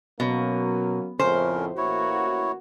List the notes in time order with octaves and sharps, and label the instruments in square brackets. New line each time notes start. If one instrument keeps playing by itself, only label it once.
[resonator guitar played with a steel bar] B2 [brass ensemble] F#3 A#3 C#4
[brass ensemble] F2 A2 C#3 [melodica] C#4 A#4 [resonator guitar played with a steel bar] C5
[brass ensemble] A1 A#3 F#4 [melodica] E4 C#5